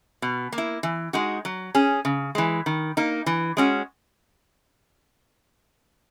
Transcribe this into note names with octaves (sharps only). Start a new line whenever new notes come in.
B2
A#3
E4
E3
G#3 D#4 F#4
F#3
C#4 G#4
C#3
E3 G#3
D#3
A#3 D#4
E3
G#3 C#4 F#4